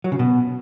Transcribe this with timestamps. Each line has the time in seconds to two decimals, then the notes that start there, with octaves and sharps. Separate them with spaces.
0.04 F#3
0.12 C#3
0.19 B2